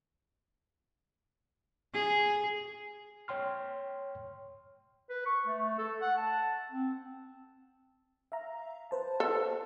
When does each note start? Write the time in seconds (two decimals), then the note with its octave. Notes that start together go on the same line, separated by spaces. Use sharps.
1.93 G#4
3.28 C#5 G5 C6 F6
5.10 B4
5.26 C#6
5.47 A3
5.79 A4
6.02 F#5
6.18 A5
6.72 C4
8.32 E5 F5 A#5
8.91 B4 C5 A5
9.20 A4